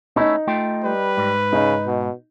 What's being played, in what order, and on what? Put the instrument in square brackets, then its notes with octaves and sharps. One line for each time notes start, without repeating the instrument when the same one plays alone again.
[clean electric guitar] A3 C#4 E4 [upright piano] D#4
[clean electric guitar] A3 F4 G5
[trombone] G3 [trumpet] B4
[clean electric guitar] G#2
[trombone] C#3 [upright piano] D#4
[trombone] B2